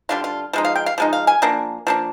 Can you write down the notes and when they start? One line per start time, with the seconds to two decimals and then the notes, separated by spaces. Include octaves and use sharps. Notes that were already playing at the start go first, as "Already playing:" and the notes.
0.09 D3 G3 D4 F4
0.24 F4
0.53 F3 G#3 D#4
0.65 F5
0.76 G5
0.86 F5
0.98 F3 G#3 D#4
1.13 F5
1.27 G#5
1.42 F3 A#3 D4
1.87 F3 A#3 D4